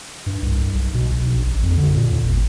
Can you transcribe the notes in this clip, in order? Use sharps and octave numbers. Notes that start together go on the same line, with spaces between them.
G2
C2
B1
B2
B1
A#1
A1
F2
D3
A#2
D#2
G#1